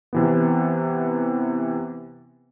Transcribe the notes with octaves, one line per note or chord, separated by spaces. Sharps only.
C3 E3 B3